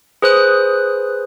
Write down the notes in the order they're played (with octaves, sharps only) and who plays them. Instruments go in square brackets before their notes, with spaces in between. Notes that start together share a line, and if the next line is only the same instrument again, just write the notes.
[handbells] G#4 B4 C5 D#6 F#6